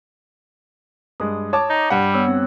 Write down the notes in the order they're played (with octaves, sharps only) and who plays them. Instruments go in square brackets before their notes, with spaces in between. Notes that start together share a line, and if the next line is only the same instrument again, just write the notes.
[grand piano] G2 G#3 [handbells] D#6
[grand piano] C#5 A5 D6
[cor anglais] D#4
[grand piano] G2 F#5 [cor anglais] G3
[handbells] B3 C#5 E6
C4